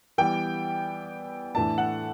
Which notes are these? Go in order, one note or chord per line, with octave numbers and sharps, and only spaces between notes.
E3 G3 B3 G5
A2 E3 A3 D4 A5
F#5